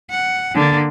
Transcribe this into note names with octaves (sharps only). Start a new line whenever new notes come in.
F#5
D3 A#3